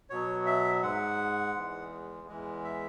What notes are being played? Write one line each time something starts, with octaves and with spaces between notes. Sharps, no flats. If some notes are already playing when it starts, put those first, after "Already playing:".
B2 F#3 C#5
E5
G#2 G#3 F#5
E2 E3 G#3
E2 E3 G#3
E5